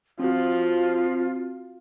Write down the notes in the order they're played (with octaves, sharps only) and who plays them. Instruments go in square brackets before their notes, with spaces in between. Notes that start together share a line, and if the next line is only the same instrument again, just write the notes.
[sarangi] F3 [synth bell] C4 F#4 [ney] F4